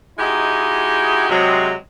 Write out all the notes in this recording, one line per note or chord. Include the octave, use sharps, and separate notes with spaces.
G#3 D#4 E4 F#4 G4
C3 F#3 G#3